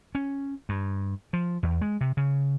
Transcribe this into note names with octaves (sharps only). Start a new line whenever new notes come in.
C#4
G2
F3
E2
G#3
C3
C#3